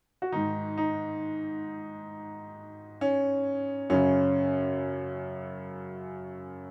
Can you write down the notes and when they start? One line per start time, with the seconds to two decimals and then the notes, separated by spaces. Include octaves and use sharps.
0.22 F#4
0.32 G#2 D#3 D#4
0.78 D#4
3.01 C#4
3.90 F#2 C#3 C#4